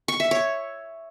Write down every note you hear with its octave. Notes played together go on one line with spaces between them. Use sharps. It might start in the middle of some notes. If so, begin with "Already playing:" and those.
C#6
E5
C#5